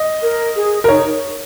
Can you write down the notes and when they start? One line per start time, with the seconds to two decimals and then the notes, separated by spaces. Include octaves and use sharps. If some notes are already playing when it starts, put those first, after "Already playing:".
Already playing: D#5
0.22 A#4
0.56 G#4
0.84 A#4
0.88 D#4 C#5